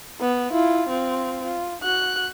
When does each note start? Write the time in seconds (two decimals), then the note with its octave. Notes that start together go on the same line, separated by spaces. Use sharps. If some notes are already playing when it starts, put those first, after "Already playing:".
0.21 B3
0.52 E4 F4
0.89 C4 F4
1.44 F4
1.81 F#4 F#6